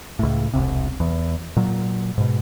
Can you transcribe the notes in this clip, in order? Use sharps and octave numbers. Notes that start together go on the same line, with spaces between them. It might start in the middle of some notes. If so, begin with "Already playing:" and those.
C#2 A2
E1 C2 C3
E2
A#2 F#3
G#2 B2